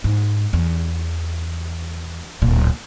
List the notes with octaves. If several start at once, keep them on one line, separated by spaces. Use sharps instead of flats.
G#2
E2
D1 A#2